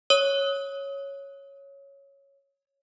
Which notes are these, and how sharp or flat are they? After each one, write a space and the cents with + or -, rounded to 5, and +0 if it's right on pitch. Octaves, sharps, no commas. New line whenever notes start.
C#5 +0 D#6 +35